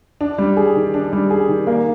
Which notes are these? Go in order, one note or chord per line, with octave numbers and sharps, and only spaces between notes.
D4
G3
G#4
D#3
D4
G3
G#4
D#3
A#3